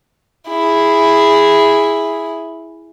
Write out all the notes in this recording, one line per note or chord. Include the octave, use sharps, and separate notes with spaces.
E4 G#4